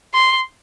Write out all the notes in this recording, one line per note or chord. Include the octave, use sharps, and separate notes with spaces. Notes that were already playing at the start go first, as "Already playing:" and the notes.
C6